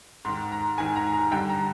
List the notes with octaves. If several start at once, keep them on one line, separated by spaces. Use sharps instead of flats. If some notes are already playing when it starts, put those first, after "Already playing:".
G#2 D#3 C6
A#5
G#2 D#3 G#5
A#5
A#5
G2 D3 G5
A#5